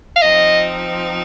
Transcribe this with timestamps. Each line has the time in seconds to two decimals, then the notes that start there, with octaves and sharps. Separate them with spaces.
0.16 F5
0.22 F3 C4 D#4 D#5